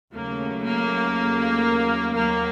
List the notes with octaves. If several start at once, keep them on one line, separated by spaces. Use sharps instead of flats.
D#2 C#3 F#3 A3 A#3
A#3
D#2 D#3 F#3 A#3